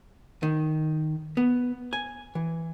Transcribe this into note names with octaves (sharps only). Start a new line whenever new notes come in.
D#3
B3
G#5
E3